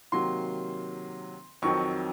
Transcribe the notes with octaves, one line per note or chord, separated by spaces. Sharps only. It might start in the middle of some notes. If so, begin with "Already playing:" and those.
C3 D#3 F#3 A#3 C6
F2 D#3 F#3 C4 C#6